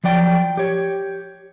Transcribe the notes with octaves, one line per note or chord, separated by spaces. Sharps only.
F3 F#3 D5 G5
G4 C#5